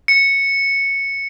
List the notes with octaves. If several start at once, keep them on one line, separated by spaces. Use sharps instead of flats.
C#7